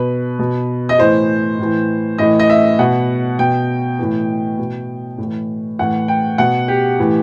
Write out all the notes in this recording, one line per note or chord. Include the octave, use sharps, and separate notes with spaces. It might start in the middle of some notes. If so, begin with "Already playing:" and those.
Already playing: B2 B4
B2
D#5
A2 E3 C5
A2 E3
A2 E3 D#5
D#5
E5
B2 F#5
B2 G5
A2 E3
B2
A2
E3
A2 E3 F#5
G5
B2 F#5
G4
A2 E3